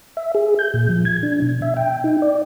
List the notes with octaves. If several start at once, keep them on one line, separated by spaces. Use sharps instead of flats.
E5
G#4
G6
A#2
F3
G#6
D4
B2
E5
G5
D#4
D5